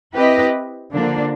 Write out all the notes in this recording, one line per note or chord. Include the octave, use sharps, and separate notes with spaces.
C4 E4 G4 B4 D#5
D3 F3 A#3 D4